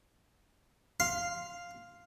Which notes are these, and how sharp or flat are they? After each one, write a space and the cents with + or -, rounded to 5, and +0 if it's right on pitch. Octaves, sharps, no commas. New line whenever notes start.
F5 +0 C6 +0